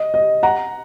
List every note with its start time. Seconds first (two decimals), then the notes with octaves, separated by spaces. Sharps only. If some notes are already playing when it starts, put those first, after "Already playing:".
Already playing: D#5
0.14 D#5
0.43 F#5 A#5